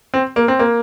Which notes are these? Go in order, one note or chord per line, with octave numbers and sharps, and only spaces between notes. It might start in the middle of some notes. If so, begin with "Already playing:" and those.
C4
A#3
C4
A#3